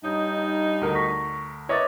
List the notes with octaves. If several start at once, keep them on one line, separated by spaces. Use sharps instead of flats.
G2 D#4 C#5 D#6 G6
D2 A#4
C#6 A#6 B6
E4 A#4 B4 C#5 D#5 E5 D6 A6